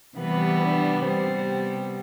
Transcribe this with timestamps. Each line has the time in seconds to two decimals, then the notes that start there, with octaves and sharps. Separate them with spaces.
0.17 C3 E3 G3 B3 B4
0.62 D4
1.04 C3 G3 B3 C4